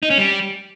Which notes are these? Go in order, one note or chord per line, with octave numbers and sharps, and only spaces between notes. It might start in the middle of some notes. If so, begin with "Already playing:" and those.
D#4
C#4
G3